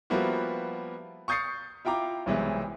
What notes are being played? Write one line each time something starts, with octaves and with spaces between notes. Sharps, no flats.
F3 G3 A#3 B3 E4 F#4
C#6 D#6 G6 A6 C7 C#7
E4 F4 G5 A#5 D6
B1 C3 E3 G3 G#3